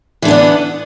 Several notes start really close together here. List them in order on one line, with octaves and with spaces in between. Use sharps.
E3 D3 B3 D4